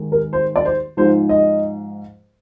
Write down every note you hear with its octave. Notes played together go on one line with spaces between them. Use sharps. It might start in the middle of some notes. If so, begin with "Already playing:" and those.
Already playing: G#2 D#3 G#3
A#4
C5
D5
C5
G#2 F3 G#3 C5
D#5